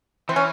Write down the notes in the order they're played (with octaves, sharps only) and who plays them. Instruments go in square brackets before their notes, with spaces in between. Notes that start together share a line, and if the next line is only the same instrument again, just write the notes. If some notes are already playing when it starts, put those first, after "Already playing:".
[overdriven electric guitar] E3 [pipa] C4
[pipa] C#4